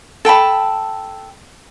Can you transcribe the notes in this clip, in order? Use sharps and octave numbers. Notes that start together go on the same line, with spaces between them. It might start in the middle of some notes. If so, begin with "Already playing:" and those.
A4 G5 A5 B5